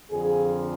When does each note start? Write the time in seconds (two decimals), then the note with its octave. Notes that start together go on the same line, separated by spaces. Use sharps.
0.11 F2 D3 F3 G#4